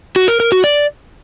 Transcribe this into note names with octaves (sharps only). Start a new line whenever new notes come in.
F#4
A#4
A#4
F#4
D5